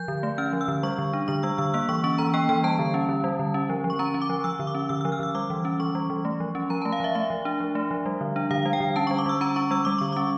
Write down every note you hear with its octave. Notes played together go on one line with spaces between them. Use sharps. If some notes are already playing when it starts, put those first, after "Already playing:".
Already playing: F3 G6
D3
A3
C#4 F6
F3
E6
D3
G3 C#6
D3
D4
D3 C#6
G3 E6
D3 E6
A#3 E6
E3 C#6
C#4 C#6
E3 A#5
A#3 G5
E3 G5
G3 A5
D3
C#4
D3
G3
D3
C#4
F3
F3
C#6
C#4 A#5
C#4
D6
F3
F3 E6
D3
D6
C#4
D3 E6
E6
F3
F6
D3 E6
G3 D6
E3
C#4
E3 C#6
G3
E3
A3
F3
C#4
F3 A#5
A5
A3
F5
F3 E5
A3 E5
F3
D4
F3
A3
F3
G3
D3
D4
D3 F5
G3
G5
D3
C#4 A5
C#6
G3
D6
G3 E6
C#4 A#5
C#4 C#6
G3 E6
G3 D6
D3 C#6
C#4 D6